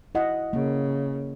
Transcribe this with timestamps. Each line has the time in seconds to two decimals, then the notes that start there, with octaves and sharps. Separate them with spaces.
0.15 E4 D#5 F#5
0.53 C#3 A#3